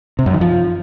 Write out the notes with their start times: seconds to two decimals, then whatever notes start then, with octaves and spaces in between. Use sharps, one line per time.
0.19 C3
0.26 F#2
0.34 D#3
0.41 F3